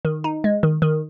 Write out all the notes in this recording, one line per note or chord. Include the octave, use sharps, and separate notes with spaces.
D#3
D#4
G#3
D#3
D#3